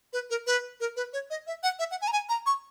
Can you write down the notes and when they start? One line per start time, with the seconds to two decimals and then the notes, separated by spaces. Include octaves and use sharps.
0.13 B4
0.30 A#4
0.47 B4
0.80 A#4
0.96 B4
1.13 C#5
1.30 D#5
1.47 E5
1.63 F#5
1.79 E5
1.91 F#5
2.02 G#5
2.08 A#5
2.13 G#5
2.29 A#5
2.46 C#6